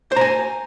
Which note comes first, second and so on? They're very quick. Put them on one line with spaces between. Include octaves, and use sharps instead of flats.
C5 A#5 G#5